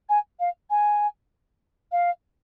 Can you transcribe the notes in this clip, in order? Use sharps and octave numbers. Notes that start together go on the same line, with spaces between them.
G#5
F5
G#5
F5